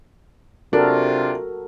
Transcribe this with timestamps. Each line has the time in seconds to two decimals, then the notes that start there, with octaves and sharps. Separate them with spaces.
0.73 C3 D4 F4 F#4 A4 A#4